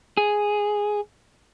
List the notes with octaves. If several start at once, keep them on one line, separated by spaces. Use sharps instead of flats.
G#4